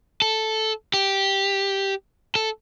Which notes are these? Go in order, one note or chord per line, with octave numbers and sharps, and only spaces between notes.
A4
G4
A4